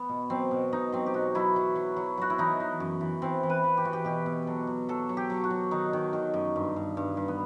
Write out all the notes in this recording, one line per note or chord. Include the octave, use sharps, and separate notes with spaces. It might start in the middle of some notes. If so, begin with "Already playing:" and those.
Already playing: B3
B2
F#3 C4
B2
B2 D#4
F#3 C4
G4
B2 F#4
F#3 E4
F#3
F#3
F#3
F#3 F#4
E4
E3 D#4
E3
F#2
E3
E3 C4
E3
B4
E3
G4
E3 F#4
G4
B2 G4
B2
F#3 A4
F#3
F#3 A4
F#3
G4
F#3
F#4
F#3
D#3 D#4
D#3
D#3
F#2
G2
G2
G2
G2
B3